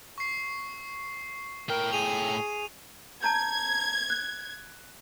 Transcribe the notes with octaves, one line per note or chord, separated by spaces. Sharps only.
C#6 C7
A2 A#4 G5
G#4 D#7 F7
A5 A#5 G6 G#6
F#6